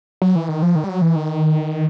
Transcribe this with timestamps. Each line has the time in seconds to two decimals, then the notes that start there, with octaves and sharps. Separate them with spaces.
0.22 F#3
0.36 E3
0.49 D#3
0.62 F3
0.75 D#3
0.84 G3
0.89 F#3
1.02 E3
1.16 D#3